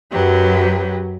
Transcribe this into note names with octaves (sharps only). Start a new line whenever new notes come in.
F#2 F#3 G4 B4